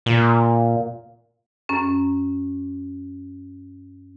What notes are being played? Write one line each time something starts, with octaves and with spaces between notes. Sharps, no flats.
A#2
F#2 C#4